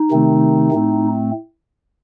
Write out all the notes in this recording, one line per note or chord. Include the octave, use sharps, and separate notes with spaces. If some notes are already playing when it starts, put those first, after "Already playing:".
Already playing: D#4
C3 D#3 A3 C4
A2 A3 C4